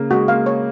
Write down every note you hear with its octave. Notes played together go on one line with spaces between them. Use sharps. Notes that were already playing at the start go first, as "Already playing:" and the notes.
Already playing: C#3 A#3
G#3 F#4
A#3 F5
C#5